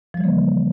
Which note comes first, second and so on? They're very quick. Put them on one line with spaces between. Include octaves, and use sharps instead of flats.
F3 G3 E3 A#3 C#3